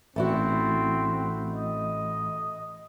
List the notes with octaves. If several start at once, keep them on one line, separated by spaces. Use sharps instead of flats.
A1 A3 C4 E4 F#4
D#5